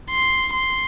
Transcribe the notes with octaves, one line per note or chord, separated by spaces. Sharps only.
C6
C6